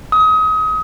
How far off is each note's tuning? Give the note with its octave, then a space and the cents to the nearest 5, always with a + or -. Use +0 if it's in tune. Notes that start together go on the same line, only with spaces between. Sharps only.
D#6 +30